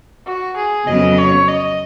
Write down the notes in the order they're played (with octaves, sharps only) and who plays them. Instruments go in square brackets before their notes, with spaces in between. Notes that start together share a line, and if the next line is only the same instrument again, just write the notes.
[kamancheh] F#4
G#4
[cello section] F2 C#3 F#3 B3 [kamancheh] D#5
[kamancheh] C#5
D#5